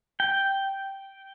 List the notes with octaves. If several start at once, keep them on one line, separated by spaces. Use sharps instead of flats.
G5